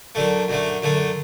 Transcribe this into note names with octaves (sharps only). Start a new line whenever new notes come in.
F#2 D3 A3
F#2 D3 A3
F#2 D3 A3